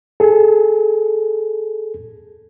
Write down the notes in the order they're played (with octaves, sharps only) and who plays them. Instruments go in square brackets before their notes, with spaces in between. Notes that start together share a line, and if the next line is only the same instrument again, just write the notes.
[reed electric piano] G#4 A4